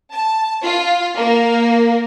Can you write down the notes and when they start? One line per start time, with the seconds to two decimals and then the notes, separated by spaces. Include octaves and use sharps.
0.12 A5
0.62 F4
1.16 A#3